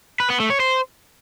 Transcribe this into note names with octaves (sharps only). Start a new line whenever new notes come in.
B4
B3
A3
C#5
C5